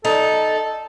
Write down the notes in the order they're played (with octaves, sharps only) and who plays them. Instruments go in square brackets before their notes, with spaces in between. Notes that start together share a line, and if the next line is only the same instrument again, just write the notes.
[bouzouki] D#4 [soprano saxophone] A4